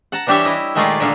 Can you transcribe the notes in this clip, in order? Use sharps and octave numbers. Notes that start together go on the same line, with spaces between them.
F#5 A5 A#5
E3 G3 D4 G4 C#5 E5
E4 D#5
A#2 D#3 G#3 A3 F4 D5
A#2 D3 F5